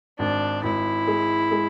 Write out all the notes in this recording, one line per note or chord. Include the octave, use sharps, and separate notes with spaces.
G#1 D4
G#1 E4
G#3
G#3